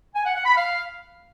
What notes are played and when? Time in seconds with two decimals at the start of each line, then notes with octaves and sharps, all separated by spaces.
0.15 G#5
0.25 F#5
0.35 F#5
0.45 B5
0.56 F5